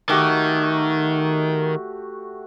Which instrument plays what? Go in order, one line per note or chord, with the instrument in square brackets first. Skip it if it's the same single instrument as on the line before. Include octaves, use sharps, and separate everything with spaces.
[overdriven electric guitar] D#3 [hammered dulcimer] A3 F#4 G4